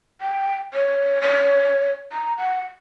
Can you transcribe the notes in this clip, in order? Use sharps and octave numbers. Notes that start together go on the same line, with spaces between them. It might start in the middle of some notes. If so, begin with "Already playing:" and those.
G5
C#5
C#5
A#5
F#5